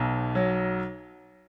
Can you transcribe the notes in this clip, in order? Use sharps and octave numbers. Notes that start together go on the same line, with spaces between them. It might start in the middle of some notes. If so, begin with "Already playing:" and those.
Already playing: B1 B2
F#3